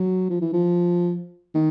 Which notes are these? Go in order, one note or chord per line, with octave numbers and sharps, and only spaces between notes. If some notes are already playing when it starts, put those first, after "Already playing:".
Already playing: F#3
F3
E3
F3
D#3